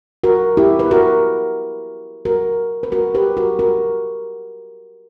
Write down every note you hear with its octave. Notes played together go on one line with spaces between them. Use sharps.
F#4 A#4
E4 G4
B4
F#4 A#4
F#4 A#4
B4
F#4 A#4
G4 B4
F#4 A#4
F#4 A#4